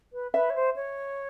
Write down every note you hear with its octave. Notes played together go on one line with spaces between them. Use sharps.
B4
B4 E5
C#5
C5
C#5